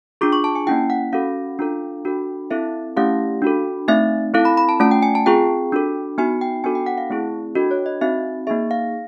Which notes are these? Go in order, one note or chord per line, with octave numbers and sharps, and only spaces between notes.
D4 F4 G#4 D6
C#6
A5
G#5
A#3 C#4 E4 G5
F#5
C#4 F#4 A4 F5
D4 F4 A4
D4 F#4 A4
C4 E4 A4 E5
A3 C#4 E4 G4 F5
D4 F#4 A4
A3 C4 D#4 E5
C4 E4 A4 F5
B5
B5
A5
A3 C#4 F4 A5
G5
G#5
A5
C4 F4 G#4 G5
D4 F#4 A4
B3 D#4 F#4 G#5
G5
B3 D4 F#4 A4 G#5
G5
F#5
F5
A3 C4 E4 G#4
D4 F#4 A4 D#5
C#5
D#5
C4 D#4 F#4 E5
A#3 D#4 G#4 E5
F5